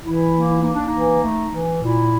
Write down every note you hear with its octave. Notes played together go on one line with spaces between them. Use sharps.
E3 E4
A#3
E4
A#3 D#4
D4
D#4
E3
A3
E3
A#2 E4